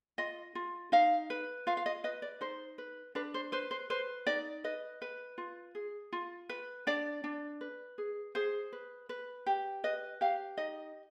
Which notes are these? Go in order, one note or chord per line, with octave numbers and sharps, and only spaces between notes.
F4 D#5
F4
D#4 F5
B4
F4 F5
F5
D#5
B4 D#5
D5
D#4 C5
B4
D4 B4
C5
B4 C5
C5
B4 C5
D#4 D5
B4 D#5
B4
F4
G#4
F4
B4
D4 D5
D4
B4
G#4
G#4 C5
B4
B4
G4
B4 D#5
G4 F5
D#4 D#5